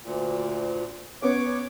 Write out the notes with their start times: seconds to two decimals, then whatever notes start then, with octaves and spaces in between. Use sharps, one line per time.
0.03 D2 A#2
1.22 B3 C#4 C#5 D6